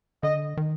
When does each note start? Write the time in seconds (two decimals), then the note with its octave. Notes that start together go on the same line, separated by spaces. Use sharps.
0.23 D3 D#5
0.57 D#3